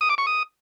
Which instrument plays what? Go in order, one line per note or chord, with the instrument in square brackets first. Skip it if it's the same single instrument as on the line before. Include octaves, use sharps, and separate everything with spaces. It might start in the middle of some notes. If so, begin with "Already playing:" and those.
[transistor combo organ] D#6
D6
C#6
D#6